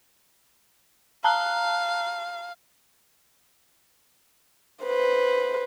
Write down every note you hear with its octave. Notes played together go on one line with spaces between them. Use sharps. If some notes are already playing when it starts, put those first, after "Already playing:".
F5 A5 A#5 F#6
B4 C5